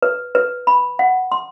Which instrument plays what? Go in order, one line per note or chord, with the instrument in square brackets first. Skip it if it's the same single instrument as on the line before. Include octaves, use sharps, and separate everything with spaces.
[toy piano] B4
B4
B5
F#5
C6